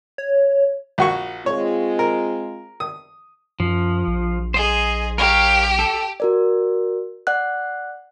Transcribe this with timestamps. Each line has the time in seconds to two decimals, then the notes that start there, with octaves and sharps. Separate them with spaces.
0.18 C#5
0.98 A#1 F#4 C#6
1.46 G#3 C4 F4 C#5
1.99 A#4
2.80 D#6
3.60 F#2 F3
4.07 A#1
4.54 G#4 C5 D#5
5.18 G4 A#4 C#5 F5
5.79 A4
6.20 F#4 A#4 D5
7.27 D5 F#5 F#6